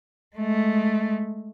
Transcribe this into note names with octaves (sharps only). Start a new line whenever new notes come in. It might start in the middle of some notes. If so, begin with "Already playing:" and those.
G#3 A3